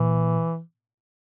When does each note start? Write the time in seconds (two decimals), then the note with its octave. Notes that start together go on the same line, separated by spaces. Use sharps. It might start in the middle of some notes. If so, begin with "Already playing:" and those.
Already playing: A#2 E3